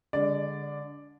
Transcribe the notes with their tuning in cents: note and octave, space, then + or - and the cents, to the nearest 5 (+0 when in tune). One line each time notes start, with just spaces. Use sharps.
D3 -20 G#3 -35 D5 +0